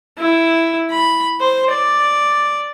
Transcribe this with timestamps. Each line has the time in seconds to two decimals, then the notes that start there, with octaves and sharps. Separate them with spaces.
0.18 E4
0.91 B5
1.40 C5
1.70 D5